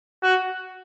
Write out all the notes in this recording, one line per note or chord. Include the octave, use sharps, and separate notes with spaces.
F#4